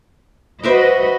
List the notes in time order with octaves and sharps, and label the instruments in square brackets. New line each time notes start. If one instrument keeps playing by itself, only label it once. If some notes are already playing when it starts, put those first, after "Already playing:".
[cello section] F#4 B4 D#5 [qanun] C5 E5 D6